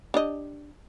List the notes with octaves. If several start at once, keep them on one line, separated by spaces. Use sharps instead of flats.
D4 G4 D#5